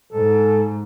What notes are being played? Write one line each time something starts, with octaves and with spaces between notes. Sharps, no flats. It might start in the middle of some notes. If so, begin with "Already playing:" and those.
G#2 A4